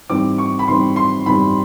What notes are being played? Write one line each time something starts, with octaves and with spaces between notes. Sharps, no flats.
G#2 E3 G3 C4 D6
C#6
B5
G#2 E3 G3 C4 C6
C6
G#2 E3 G3 C4 B5